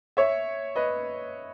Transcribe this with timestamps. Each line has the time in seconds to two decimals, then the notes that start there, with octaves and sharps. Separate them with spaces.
0.17 C#5 E5
0.76 B4 D#5